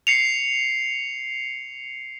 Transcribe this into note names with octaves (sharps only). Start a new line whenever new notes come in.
C7 C#7 F7